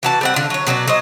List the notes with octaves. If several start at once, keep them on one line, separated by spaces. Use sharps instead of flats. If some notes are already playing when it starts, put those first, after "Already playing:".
E3 F#4 A5
G3 C4 F#5
D3 F4
F#3 C#5
B2 F#3 F#4 D5
F#3 C5 D#5